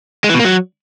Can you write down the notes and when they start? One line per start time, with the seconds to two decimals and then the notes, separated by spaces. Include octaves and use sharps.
0.24 G#3
0.29 E3
0.34 B2
0.40 A#3
0.45 F#3